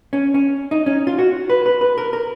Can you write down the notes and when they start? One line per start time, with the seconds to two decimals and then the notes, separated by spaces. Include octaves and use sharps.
0.13 C#4
0.34 C#4
0.71 D#4
0.86 C#4
1.07 F4
1.19 F#4
1.50 B4
1.66 B4
1.81 B4
1.98 A#4
2.13 A#4